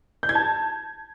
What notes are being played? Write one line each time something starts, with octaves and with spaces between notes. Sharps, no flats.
G6
G#6
A5